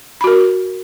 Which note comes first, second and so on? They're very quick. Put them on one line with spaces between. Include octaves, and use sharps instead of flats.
B5 F#4 A#4